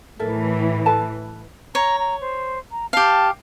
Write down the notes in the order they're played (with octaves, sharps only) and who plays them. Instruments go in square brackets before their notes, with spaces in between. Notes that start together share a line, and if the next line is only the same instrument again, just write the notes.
[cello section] A2 E3 [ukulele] A4 A#4 E5
[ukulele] A4 B4 A5
[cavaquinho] C#5 [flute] A#5
[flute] A#5
C5
A#5
[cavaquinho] G4 F5 [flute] A5